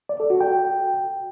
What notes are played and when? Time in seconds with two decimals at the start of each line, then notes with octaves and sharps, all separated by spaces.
0.09 D5
0.20 A4
0.30 F#4
0.41 G5